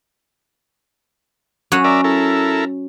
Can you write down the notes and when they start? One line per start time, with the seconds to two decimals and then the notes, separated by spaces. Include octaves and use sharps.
1.72 F#3 C#4 F#5
1.84 A#4 D5 E5
2.04 E4 A4 A#4